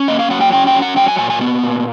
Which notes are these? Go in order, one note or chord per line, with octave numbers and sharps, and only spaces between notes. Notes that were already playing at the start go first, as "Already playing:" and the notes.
Already playing: C#4
A#3 D#5
F5
F#3 F#5
G5
C#4 G5
G5
F#3
F#5
F#3 G5
G#5
A#2 G#5
G#5
B3
A#2